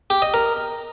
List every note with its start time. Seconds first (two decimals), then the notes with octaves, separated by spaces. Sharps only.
0.10 G4
0.22 D#5
0.34 A#4